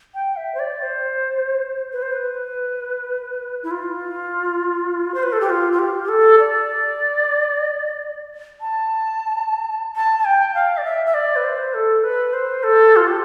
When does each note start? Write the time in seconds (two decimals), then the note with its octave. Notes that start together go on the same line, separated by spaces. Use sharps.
0.15 G5
0.36 E5
0.55 C5
0.60 D5
0.82 C5
1.93 B4
2.02 C5
2.12 B4
3.63 E4
3.71 F4
5.14 C5
5.23 B4
5.33 A4
5.41 G4
5.50 F4
5.72 F4
5.79 G4
6.04 G4
6.09 A4
6.39 D5
8.61 A5
9.96 A5
10.19 A5
10.25 G5
10.55 F5
10.78 D5
10.84 E5
11.06 E5
11.14 D5
11.36 B4
11.44 C5
11.74 A4
12.04 B4
12.33 C5
12.63 A4
12.96 F4
13.07 G4